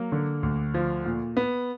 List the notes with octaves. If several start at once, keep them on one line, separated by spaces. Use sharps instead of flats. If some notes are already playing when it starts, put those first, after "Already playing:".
Already playing: F#3 A#3
D3
D2
F3
A#2
B3